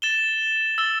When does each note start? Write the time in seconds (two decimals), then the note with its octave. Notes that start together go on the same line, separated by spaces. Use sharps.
0.02 A6 E7 G7
0.78 E6 A6 E7 G7